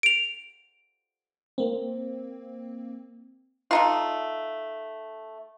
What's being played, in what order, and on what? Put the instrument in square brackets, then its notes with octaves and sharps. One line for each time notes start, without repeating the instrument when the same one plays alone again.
[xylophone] D7 F7
[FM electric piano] A#3 C4
[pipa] A3 D#4 F4